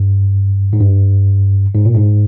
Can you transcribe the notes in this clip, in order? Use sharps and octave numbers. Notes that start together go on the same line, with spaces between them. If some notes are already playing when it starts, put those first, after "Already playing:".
Already playing: G2
G#2
G2
G#2
A#2
G#2